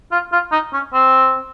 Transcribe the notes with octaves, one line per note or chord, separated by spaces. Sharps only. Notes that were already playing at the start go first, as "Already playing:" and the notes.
F4
F4
D#4
C#4
C4